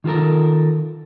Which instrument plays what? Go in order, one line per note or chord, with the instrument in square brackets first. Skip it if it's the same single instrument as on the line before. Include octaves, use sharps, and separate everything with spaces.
[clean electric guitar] D#3 F4 F#4 A4 A#4